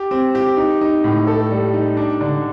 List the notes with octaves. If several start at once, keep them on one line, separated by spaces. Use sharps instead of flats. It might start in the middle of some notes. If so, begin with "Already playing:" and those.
Already playing: G4
C4
G4
D#4
D#4
A2
A4
G3
D#4
D4
D3